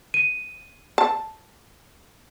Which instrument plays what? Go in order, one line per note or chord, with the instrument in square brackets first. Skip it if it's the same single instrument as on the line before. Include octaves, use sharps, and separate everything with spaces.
[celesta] D#7
[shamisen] A5